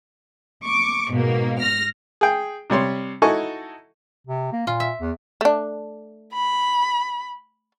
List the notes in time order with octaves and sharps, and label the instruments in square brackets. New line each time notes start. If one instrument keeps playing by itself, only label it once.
[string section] C#6 D6
G#2 B2 A#3
F6 A#6
[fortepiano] G#4 G5
C3 G3 C#5 C6
D#4 E4 F#4 A4 G#5 C#6
[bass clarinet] C3
A#3
[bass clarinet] A#2 [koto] F4
[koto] E5
[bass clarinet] E2
[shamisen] A3 D4
[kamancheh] B5